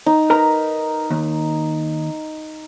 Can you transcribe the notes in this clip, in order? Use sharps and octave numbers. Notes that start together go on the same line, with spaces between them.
D#4
A#4 B4 A#5
D#2